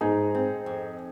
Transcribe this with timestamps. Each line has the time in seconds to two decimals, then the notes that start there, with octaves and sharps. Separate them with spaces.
0.01 G#2 D#4 G#4
0.35 C4
0.66 F2